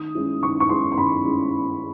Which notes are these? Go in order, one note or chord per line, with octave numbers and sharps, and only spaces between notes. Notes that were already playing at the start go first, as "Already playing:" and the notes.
Already playing: D#3 D#6
G#3 C#4 E4
D#3 C#6
C#6
G#3 C#4 E4 C6
C6
D#3 B5
G#3 C#4 E4